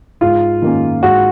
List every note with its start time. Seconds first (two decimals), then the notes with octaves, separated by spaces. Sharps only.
0.21 G#2 F4
0.62 D#3 A#3 C#4
1.02 G#2 F#4